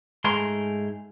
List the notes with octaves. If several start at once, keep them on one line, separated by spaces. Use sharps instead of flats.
G#2 A3 G#4 A#4 C6